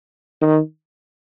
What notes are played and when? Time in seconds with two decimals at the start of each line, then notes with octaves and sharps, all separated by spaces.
0.42 D#3